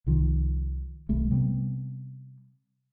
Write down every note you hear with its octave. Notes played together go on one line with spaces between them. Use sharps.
C2 D#3 F3
D#1 B1 G3 A3
C3 G3 B3